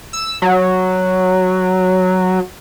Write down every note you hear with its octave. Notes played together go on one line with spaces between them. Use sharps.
E6
F#3